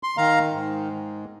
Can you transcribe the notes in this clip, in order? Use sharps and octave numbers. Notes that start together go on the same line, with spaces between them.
C6
D#3 F5 A#5
G#2